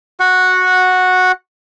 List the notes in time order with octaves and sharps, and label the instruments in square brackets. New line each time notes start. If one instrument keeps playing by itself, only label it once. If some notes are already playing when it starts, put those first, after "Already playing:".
[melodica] F#4 F#5